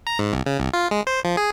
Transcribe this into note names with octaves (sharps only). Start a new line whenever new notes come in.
A#5
G#2
C2
C#3
C2
F4
G#3
C5
F3
G#4